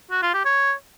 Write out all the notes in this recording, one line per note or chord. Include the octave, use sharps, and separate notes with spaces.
F#4
F4
G4
C#5